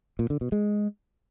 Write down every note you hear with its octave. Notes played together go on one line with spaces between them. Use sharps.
A#2
D3
B2
G#3